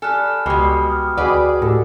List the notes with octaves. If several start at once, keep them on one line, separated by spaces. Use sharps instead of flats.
G3 A4 G#5 F6 F#6
C#2 B2 G3 G#3
D#6 F6
D2 F#4 G#4 B4 D5 D#5
A2 G4 A4